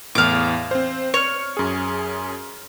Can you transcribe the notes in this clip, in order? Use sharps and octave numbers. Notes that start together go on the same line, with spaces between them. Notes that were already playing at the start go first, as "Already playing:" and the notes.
E2 A2 F5 D6
C4 C5
C#5 F6 C#7
F#2 G#4